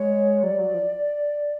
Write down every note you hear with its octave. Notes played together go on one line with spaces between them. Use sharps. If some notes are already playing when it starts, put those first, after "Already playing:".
Already playing: G#3 C#5
F#3 D5
G3
F#3
F3